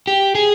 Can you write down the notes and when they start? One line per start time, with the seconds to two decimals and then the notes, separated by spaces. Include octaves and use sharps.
0.07 G4
0.35 G#4